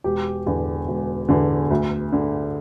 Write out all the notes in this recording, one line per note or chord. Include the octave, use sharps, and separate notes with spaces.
E1 G4
E2 D3
E1
E2 D3
D2
D3